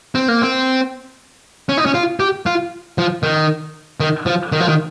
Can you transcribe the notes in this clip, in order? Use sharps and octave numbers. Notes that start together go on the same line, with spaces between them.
C4
A#3
C4
C#4
D#4
C#4
F4
G4
F4
F3
D#3
D#3
F3
D#3
F3
D#3